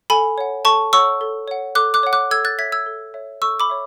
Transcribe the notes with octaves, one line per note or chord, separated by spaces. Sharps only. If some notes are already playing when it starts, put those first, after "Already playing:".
A4 G#5 B5
C#5 F#5
A4 A5 C#6
C#5 F#5 C#6 E6
A4
C#5 F#5
A4 D6 F#6
D6 F#6
C#5 F#5
D6 F#6
A4 E6 G#6
F#6 A6
C#5 E5 G#6 B6
E6 G#6
A4
C#5 E5
A4 C#6 E6
B5 D6
C#5 E5